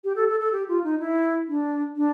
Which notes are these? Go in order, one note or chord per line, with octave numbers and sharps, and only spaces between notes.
G4
A4
A4
A4
G4
F4
D#4
E4
D4
D4